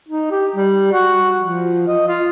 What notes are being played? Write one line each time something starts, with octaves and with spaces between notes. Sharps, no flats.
D#4
G4
G3
F#4
F3
D#5
F4